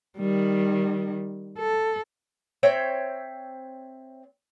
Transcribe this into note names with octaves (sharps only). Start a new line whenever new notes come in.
D#3 G3
A4
C4 C#5 E5 G5